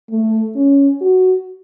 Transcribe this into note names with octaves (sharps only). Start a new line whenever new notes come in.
A3
C#4
F#4